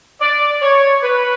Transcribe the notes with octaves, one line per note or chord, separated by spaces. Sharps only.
D5
C#5
B4